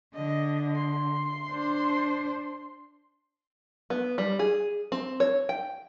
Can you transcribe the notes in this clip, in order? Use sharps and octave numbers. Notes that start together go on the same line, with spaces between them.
D3 D#5
C6
D4 C5
B3
G3
G#4
C4
C#5
G5